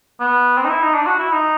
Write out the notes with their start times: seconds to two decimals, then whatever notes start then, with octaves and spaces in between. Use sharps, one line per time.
0.20 B3
0.57 C4
0.65 D#4
0.69 E4
0.82 D#4
0.94 D4
1.06 F#4
1.19 E4
1.32 D#4